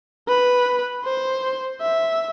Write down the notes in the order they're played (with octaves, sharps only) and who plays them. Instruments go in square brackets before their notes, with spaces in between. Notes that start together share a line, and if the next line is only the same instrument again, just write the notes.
[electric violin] B4
C5
E5